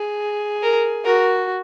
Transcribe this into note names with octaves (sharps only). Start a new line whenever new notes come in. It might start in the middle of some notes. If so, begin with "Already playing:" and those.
Already playing: G#4
A#4
F#4 A#4